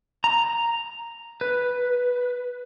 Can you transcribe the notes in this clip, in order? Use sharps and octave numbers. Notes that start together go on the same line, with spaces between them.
A#5
B4